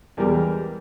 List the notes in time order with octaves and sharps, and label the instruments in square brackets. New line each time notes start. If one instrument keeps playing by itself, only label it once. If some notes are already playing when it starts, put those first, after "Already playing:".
[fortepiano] E2 G3 G#3 G4 A#4